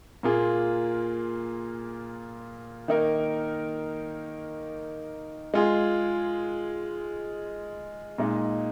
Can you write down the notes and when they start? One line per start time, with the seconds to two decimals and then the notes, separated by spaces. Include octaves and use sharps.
0.23 A#2 A#3 F4 G#4
2.88 D#3 A#3 D#4 A#4
5.54 G#3 F4 G#4
8.18 A#2 G#3 D#4